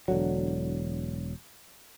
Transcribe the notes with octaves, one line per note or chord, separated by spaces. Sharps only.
E1 D3 F#3